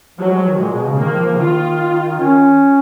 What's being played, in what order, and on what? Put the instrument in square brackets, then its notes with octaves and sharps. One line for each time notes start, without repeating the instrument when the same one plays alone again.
[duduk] F3 [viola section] F#3
[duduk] G#3
F3
D#3
[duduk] A#2 [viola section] G#3
[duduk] B2
C#3
[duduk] D#3 [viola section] A#3
[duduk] F3
F3
C#3
[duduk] D#3 [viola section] F4
[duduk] C#4